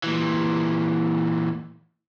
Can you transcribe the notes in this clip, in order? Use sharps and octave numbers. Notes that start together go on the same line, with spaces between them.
A#2 E3